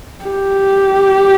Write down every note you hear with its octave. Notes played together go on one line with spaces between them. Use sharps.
G4